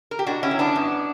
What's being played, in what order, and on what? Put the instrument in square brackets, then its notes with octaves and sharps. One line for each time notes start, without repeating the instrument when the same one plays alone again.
[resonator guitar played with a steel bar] A#4
G4
B2 D4 F#4
C#4 E4
F#3
B3 D4
F#2